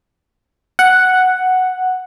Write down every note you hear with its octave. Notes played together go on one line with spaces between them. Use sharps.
F#5